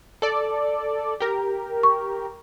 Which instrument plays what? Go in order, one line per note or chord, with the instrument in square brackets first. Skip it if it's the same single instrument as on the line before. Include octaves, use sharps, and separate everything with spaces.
[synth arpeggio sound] A4 D5
G4 A#4
[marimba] C#6